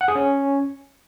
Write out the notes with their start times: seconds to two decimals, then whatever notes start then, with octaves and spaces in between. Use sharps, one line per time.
0.01 F#5
0.08 G#4
0.15 C#4